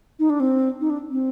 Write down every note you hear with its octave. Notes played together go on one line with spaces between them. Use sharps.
D#4
D4
C4
D#4
D4
C4